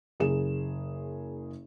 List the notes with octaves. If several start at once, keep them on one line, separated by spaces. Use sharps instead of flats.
F#1 G#4 E7